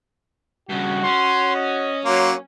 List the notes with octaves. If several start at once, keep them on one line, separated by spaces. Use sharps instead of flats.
G2 C#3 F#4
C#4 C6
D#5
F#3 A#3 C6